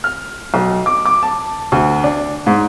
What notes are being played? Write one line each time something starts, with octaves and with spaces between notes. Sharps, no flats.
F6
B1
D6
D6
A5
D2
D4
G#2